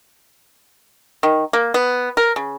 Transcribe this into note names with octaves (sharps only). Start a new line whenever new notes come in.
D#3
A#3
B3
A#4
C#3